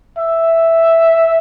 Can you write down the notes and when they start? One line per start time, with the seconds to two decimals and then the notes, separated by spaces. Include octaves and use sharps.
0.18 E5